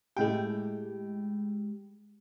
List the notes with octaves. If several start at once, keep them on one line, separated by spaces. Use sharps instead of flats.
A2 G#3 G4 G5